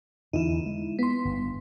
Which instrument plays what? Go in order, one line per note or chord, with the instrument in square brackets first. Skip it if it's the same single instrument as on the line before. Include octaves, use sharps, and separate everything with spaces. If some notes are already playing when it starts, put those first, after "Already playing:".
[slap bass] E2 D3 E3 [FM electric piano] D#4 E4
[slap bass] G#3
[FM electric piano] B3 C6
[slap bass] G1